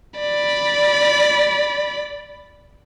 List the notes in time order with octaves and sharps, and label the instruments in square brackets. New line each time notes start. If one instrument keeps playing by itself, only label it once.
[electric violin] D5 B5